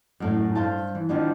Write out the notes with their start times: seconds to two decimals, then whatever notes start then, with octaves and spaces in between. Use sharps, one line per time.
0.20 F#2 A2 F#3
0.55 G2 C5 F5 A5
0.95 E3
1.09 D#3 F3 G3 B3 D4